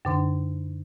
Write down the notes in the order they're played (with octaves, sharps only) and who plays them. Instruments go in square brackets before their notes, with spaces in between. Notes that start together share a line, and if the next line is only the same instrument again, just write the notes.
[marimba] F#2 D3 D4